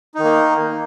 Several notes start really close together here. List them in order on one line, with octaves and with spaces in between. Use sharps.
D#4 D#3 A#3